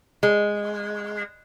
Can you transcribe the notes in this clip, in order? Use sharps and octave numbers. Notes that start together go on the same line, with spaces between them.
G#3